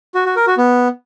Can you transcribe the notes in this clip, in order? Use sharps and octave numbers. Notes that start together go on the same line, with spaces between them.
F#4
F#4
A#4
F#4
B3